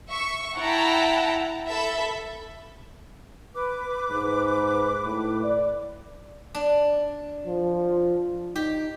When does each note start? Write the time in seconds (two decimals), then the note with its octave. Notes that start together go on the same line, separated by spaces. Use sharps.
0.10 E5 C#6
0.57 E4 F#5 G5 A5 A#5
1.70 A4 E5 B5
3.55 B4 D6
4.11 G#2
5.06 A2
5.44 D5
6.55 D4
7.47 F3
8.56 D#4 G4